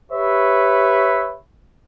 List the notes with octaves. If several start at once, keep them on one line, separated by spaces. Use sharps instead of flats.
G4 B4 C#5 E5